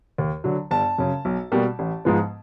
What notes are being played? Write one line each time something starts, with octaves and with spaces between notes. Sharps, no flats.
D#2
D3 F#3
G1 A5
F#2 C#3
B1
B2 G3 A#3
A1
G#2 F3 G#3 B3